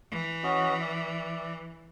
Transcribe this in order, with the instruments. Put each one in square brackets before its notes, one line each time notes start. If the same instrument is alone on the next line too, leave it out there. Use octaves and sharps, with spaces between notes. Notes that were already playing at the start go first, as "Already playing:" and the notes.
[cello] E3
[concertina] C#4 F#4 D#5
D5 E5